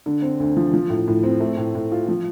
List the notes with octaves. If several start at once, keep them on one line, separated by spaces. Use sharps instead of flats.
D3
C4
D2
F3
F3
A2
A2
C4
A3
A2
A2
F4
F3